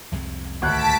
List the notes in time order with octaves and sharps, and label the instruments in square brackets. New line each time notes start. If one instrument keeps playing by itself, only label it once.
[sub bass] C2 [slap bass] F2 C3 G#3
[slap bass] G#1 D#3 G#3 [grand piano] D2 F#6 [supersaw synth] A5 B6 D7